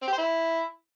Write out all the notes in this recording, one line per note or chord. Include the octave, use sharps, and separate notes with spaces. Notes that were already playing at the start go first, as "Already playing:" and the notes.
C4
G4
C5
E4